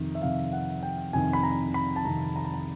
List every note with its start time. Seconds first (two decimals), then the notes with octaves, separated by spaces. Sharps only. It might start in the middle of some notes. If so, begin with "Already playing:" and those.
Already playing: F2 C3 D#3
0.15 E5
0.22 F2 C3 D#3 F5
0.53 F#5
0.83 G5
1.13 F2 C3 D#3 G#5
1.33 B5
1.43 A#5
1.74 B5
1.96 A5
2.05 F2 C3 D#3 A#5
2.36 A#5
2.45 B5
2.54 A#5